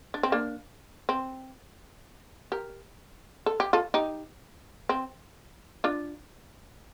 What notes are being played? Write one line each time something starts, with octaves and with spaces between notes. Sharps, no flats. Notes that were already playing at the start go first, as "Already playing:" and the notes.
D4
C4
A#3 D4
C4
G4 A#4
A4
G4
F4 A4
D#4 G4
C4
D4 F4